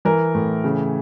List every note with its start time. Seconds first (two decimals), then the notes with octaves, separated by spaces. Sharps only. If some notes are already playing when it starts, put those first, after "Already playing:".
0.05 E3 A#4
0.35 A2
0.64 C#3